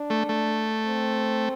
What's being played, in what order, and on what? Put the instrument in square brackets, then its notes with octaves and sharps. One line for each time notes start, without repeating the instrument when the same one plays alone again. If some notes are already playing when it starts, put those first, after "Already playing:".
Already playing: [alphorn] D4
[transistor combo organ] A3
A3
[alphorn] C4